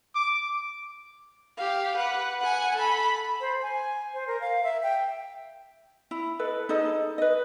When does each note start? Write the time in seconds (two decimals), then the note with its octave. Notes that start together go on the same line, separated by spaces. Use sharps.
0.15 D6
1.57 G4 F5
1.97 B4 F#5
2.40 F#5 G#5
2.75 A4 B5
3.41 C5
3.62 G#5
4.14 C5
4.27 A#4
4.41 F5
4.64 E5
4.83 G5
6.11 E4
6.39 A4 B4 D#5
6.69 D#4 G#4 A4 D#5
7.18 B4 D#5